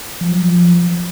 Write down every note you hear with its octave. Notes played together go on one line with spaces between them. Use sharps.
F3
F#3
F3